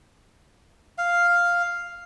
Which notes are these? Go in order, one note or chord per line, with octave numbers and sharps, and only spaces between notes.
F5